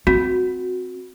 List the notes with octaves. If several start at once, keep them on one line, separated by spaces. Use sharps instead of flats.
C4 F#4